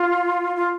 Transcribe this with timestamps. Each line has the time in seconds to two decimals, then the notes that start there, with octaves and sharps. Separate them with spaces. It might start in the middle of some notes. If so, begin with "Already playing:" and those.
Already playing: F4
0.56 F4